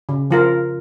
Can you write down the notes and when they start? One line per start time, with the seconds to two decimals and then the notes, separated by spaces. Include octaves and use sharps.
0.09 C#3
0.31 F3 F4 A#4